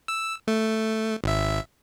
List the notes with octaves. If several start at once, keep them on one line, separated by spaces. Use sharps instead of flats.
E6
A3
G#1 E5